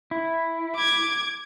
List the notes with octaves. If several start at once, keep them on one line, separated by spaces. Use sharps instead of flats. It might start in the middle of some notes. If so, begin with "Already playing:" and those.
E4
D6 G#6